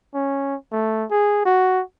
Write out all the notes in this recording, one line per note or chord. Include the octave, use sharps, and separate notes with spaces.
C#4
A3
G#4
F#4